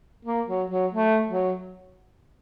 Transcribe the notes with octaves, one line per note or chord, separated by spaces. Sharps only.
A#3
F#3
F#3
A3
F#3